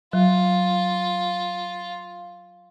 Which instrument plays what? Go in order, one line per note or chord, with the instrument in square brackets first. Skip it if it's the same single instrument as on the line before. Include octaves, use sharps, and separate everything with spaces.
[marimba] F#3 [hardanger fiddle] F4